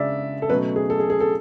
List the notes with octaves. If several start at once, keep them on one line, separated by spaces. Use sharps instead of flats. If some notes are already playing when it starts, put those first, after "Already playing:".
Already playing: C#3 G#3 D4 D5 E5
A4
B2 F#3 A3 C#4 B4
G#4
A4
G#4
G#4
A4